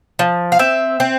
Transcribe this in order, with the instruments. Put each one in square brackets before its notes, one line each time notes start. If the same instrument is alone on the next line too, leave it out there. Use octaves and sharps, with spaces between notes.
[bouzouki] F3
F5
C4 E5
C4